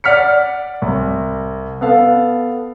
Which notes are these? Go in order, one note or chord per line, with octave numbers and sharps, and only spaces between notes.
D5 F#5 F6 B6 C#7
C2
B3 A4 F5